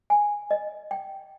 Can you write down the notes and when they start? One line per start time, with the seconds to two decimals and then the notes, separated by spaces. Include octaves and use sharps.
0.10 G#5
0.51 D#5
0.91 G5